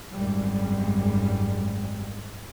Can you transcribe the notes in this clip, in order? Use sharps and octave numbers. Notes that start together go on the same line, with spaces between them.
G#1 F#2 G3 G#3